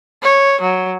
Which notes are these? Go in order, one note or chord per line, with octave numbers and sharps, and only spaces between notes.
C#5
F#3